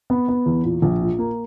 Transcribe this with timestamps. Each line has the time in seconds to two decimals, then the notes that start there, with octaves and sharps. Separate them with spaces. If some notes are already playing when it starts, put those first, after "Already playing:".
0.10 B3
0.29 B3
0.46 E2
0.64 A#2
0.82 A#1
1.01 A#2
1.19 A#3